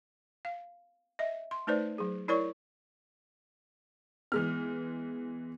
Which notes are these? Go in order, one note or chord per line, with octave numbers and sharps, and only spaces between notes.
F5
D#5 E5
C6
A3 D#4 B4 C5 D5
F#3 G#4
E4 A#4 C#5 D5 C#6
E3 G#3 B3 F6